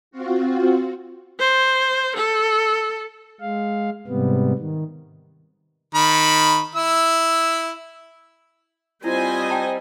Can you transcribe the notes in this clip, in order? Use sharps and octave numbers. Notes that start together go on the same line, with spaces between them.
C4 F4 F#4
C5
A4
G#3 F5
G#2 C3 G3 B3
D#3
D#3 B5
E4 E6
G3 C4 E4 F4 C5 D#5 G#5
G5 A5 A#5